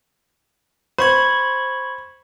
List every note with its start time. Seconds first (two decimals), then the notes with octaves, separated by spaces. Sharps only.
0.98 C5 B5 C#6 G#6